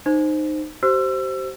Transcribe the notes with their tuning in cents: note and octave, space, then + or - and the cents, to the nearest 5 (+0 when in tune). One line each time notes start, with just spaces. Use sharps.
D#4 -20 C5 +0
G4 -45 C5 +0 E6 +30